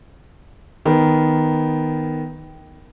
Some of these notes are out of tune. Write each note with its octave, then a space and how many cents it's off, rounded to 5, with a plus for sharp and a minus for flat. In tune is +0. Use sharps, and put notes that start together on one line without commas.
D#3 +0 B3 +0